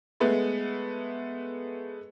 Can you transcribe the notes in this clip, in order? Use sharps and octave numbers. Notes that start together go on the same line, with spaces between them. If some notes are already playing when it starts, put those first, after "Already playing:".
G#3 A3 B3